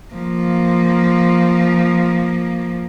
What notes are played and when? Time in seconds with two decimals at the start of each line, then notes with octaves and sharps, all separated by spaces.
0.14 F3 A#3